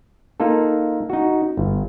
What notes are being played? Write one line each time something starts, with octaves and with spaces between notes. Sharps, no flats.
A#3 D#4 F4 A4
D#4 F#4
G1